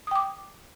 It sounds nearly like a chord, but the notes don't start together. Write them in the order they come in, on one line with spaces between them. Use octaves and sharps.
D#6 G5 D6